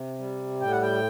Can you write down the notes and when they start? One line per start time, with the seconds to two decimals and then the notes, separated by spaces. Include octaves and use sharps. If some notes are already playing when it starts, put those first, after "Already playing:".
Already playing: C3
0.19 G3
0.61 A2 G5
0.71 F#5
0.82 G5